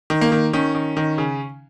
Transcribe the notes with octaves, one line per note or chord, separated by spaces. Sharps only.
D#3
A#3
D#3
D#3 C#4
D#3
D#3
C#3